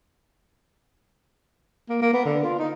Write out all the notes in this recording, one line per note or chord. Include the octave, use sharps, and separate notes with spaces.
A#3
A#3
B3
D3
F4
D#4